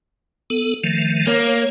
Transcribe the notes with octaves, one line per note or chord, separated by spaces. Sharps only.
B3 A4
D#3 F3 A3
A#3 C#5